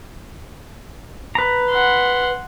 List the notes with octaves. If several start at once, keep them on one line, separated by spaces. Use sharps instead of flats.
B4 A#5
F#5 C6